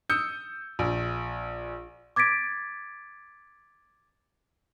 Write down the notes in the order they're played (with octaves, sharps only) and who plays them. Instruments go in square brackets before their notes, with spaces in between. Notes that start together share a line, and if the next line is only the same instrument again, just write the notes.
[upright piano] D#6 E6 G6 C#7
A#1
[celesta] D6 G#6 A6 B6 D7